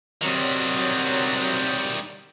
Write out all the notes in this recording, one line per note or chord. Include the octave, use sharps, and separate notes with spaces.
C3 D#3 F#3 G3